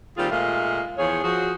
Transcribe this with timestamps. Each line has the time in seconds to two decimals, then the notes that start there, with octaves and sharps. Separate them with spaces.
0.17 D#2 G3 C4 F4 G4 G#4
0.31 A#2 G#3 A3 F5
0.98 E2 F3 G#4 C#5
1.23 F3 F#4 G#4